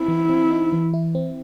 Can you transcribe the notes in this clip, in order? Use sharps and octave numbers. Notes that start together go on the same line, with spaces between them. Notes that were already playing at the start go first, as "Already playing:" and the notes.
Already playing: C4 E4
E3
C4
D#4
E3
E4
C4